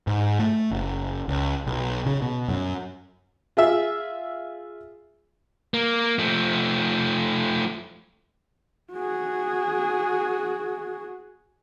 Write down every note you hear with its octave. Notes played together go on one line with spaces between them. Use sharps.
G#2
A3
F#1
C#2
B1
C#3
B2
F#2
F4 G#4 E5
A#3
F3 A3
F#4 G#4